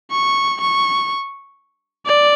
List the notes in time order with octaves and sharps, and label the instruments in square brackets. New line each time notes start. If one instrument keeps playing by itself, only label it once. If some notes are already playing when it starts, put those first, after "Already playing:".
[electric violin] C#6
C#6
D5